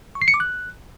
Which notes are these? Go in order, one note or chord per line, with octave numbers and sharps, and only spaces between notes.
C#6
C7
C#7
D6
F#6